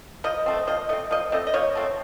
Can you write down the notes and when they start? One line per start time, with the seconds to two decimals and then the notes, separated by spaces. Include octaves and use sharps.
0.24 F3 D#5
0.46 A3 C4
0.67 F3 D#5
0.89 A3 C4 D#5
1.11 F3 D#5
1.32 A3 C4 D#5
1.47 D#5
1.54 F3 C#5
1.75 A3 C4